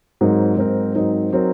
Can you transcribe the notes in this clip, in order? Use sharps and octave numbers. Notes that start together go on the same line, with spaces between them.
G#2 F#3 C4 D#4 A#4
G#2 F#3 C4 D#4 A#4
G#2 F#3 C4 D#4 A#4
F#3 C4 D#4 A#4